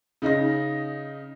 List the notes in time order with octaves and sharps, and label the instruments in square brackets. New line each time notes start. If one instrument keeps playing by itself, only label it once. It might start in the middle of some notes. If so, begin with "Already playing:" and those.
[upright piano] C#3 D#4 D#5 A#6